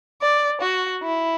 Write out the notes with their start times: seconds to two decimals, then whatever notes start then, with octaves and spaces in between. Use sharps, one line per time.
0.22 D5
0.61 F#4
1.03 E4